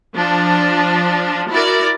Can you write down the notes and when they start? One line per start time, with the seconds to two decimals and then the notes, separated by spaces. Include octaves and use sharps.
0.16 F3 D4
1.50 E4 F#4 A#4 D5